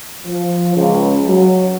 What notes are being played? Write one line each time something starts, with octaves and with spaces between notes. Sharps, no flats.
F3
C#2
F#3